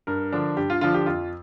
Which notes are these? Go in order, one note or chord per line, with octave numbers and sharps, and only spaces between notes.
G2 A#4
D3 F3 D4
G2 G4
F4
D3 F3 D4 F4
G4
F2 F4